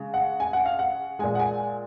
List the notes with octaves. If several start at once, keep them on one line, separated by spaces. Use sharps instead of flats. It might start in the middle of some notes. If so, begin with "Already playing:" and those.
Already playing: C#3 G#3
F#5
G#5
F#5
F5
F#5
A#2 G#3 G#5
F#5
G#5